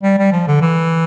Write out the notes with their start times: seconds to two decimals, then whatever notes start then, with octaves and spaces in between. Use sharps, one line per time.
0.03 G3
0.18 G3
0.32 F3
0.47 D3
0.61 E3